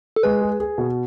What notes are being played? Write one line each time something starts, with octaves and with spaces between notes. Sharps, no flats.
A4
G#3 B4
G#4
G#4
B2